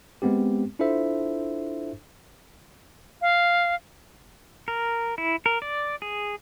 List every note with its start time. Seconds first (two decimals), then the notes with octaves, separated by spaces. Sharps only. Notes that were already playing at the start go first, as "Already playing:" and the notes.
0.22 G#3 B3 C4 G4
0.79 D4 E4 F4 A4 C5 E5
3.22 F5
4.68 A#4
5.18 E4
5.46 A#4
5.62 D5
6.02 G#4